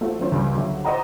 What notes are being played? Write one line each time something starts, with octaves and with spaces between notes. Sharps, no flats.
A3 C4 F4 F#4
F#3 C4 C#4 F4 C5 C#5
C#2 G3
D2 F#3 G4 E5
C5 D5 D#5 F#5 A#5